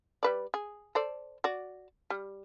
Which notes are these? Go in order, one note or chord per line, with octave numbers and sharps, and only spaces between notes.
G3 B4 D5
G#4
A4 C5 D5
F#4 D5
G3